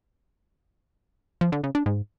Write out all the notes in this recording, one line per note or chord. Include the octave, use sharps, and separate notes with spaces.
F3
D3
C#3
D4
G#2